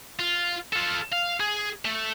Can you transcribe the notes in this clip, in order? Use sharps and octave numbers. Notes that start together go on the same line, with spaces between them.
F4
F4 A4
F5
G#4
A3